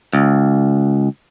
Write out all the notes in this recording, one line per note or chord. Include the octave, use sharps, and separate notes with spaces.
C#2